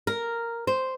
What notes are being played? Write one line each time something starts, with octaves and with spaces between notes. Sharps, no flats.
A#4
C5